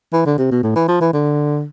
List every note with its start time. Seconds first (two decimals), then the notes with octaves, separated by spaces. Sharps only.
0.13 E3
0.25 D3
0.38 C3
0.51 B2
0.63 A2
0.76 E3
0.88 F3
1.01 E3
1.13 D3